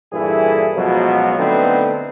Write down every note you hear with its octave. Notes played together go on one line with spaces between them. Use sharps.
G2 A#2 E3 E4 G#4 A4
C#2 B2 F3 F#3
D3 A3 B3 C4 D#4 B4